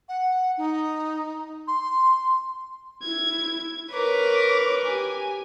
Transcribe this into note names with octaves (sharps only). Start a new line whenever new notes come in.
F#5
D#4
C6
E4 G#6
A#4 B4 C#5 D6
G4 G#5